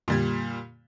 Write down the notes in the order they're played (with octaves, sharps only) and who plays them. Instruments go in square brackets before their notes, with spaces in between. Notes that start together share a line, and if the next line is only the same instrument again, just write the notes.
[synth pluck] F2 D3 G#6 [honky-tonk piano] A#2 G3